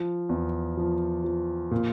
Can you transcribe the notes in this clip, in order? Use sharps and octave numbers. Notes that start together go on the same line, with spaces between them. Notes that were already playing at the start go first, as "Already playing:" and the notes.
Already playing: F3
E2
F3
F3
A#2